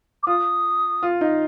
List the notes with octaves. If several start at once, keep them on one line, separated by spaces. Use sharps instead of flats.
D6
F4 D#6
F4
D#4